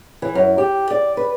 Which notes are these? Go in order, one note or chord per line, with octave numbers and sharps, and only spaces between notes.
E3
F#2
G4
D5
B4